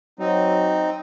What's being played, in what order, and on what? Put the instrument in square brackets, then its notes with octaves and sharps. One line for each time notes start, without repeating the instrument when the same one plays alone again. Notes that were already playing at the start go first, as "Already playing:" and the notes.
[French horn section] F#3 [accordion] C4 D#4